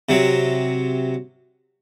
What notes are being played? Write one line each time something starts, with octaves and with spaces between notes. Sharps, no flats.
C3 F#3